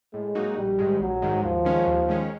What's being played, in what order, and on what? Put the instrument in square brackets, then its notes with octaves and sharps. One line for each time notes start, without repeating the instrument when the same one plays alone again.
[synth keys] A2 [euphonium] G#3
[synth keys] F#3 A#3 D#4 F#4
[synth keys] A#1 [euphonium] G3
[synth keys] G#2 D#3 G#3
[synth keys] A#1 [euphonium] F#3
[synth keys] G#2 D#3 G#3
[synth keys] D#2 [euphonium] F3
[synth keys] D#3 G#3 C#4
D#2
D#3 G#3 C#4